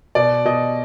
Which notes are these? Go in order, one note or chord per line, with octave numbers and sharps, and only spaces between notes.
B2 D5
B2 D#5